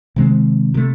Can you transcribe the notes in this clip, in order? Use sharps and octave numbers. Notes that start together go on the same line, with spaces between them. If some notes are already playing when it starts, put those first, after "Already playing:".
C3 D#3 G#3 C4
C3 F3 A3